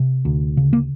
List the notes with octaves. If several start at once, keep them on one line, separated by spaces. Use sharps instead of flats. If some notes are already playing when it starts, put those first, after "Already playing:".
Already playing: C3
D2
C#3
A#3